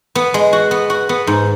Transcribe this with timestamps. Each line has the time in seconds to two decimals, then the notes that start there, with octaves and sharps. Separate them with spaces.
0.15 B3
0.34 G#3
0.53 F#4
0.71 B3
0.90 F#4
1.09 B3
1.27 G#2